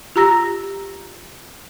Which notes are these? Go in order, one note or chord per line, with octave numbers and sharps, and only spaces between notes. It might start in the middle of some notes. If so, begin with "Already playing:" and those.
F4 G4 A#5 E6 A#6